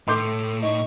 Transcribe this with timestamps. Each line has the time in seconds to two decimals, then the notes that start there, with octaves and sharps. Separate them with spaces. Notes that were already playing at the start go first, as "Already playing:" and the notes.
0.08 A2 A4 C6 D6 G6
0.62 D#4 C#6